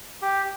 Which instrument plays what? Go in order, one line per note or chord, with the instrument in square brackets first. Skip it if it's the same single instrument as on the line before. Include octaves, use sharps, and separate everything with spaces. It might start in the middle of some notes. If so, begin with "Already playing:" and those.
[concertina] G4